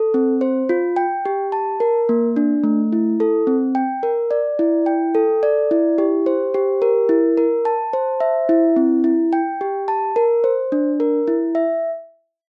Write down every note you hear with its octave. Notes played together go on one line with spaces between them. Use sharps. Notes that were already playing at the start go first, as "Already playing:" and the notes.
Already playing: A4
C4
C5
F4
G5
G4
A5
A#4
A#3
D4
A3
E4
A4
C4
G5
A#4
D5
E4
G5
A4
D5
E4
G4
C5
G4
A#4
E4
A#4
A5
C5
E5
E4
C4
E4
G5
G4
A5
A#4
C5
D4
A#4
E4
E5